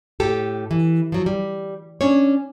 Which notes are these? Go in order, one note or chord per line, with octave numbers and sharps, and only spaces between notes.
A2 G4 A4
E3
F3 F#3
G3
C#4 D4 C#5